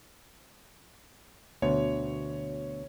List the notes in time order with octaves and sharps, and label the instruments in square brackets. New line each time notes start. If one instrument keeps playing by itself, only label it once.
[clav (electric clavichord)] D2 B2 [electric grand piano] C#5